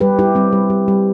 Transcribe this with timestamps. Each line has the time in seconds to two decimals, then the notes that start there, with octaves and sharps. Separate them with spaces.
0.01 G3 G4 B4
0.19 G3 E4 G4
0.35 G3 C4
0.53 G3
0.70 G3
0.88 G3